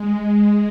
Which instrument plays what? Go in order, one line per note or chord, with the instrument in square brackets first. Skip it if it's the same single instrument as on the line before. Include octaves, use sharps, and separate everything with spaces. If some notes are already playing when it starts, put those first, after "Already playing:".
Already playing: [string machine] G#3